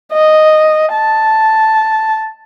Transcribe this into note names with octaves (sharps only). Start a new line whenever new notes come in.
D#5
A5